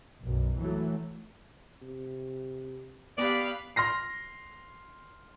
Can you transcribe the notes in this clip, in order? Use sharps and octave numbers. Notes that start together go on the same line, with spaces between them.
B1 F#2
E3 F#3 A3
C3
B3 G4 D5 F5 B5 F#6
C6 F6 A#6 C7